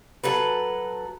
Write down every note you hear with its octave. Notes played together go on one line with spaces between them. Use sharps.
F#3 A4 B4